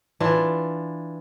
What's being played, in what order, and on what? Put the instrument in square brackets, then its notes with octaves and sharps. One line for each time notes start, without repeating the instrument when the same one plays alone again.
[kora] E3 D4 F4